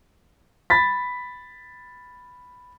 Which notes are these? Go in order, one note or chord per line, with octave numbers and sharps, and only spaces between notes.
B5 A6 B6